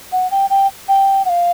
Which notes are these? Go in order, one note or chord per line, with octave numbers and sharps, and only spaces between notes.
F#5
G5
G5
G5
F#5
F5